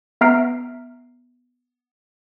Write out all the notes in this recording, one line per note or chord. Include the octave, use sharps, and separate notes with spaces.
B3 E5 A#5 F6 C7 D7